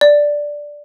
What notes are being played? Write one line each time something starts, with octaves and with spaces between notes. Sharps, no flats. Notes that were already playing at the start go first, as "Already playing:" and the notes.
D5